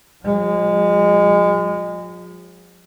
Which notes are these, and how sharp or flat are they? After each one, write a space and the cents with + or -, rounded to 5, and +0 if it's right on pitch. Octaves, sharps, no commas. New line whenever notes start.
F3 +35 G#3 -25